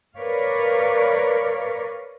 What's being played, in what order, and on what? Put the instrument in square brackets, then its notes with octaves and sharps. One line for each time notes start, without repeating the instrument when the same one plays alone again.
[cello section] A#4 B4 C#5 D5 F5